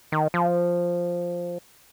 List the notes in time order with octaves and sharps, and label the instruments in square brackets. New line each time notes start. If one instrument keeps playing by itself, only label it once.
[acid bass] D#3
F3